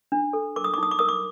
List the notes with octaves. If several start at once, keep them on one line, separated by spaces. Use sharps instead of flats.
D4
A4
A#4 D6
D#6
D6
D#4 D#6
D6
A#4 D#6
D6